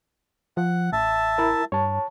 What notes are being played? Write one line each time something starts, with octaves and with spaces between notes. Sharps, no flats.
F3 F#5
A1 E5 A5
E4 A#4
G2 C#5 A5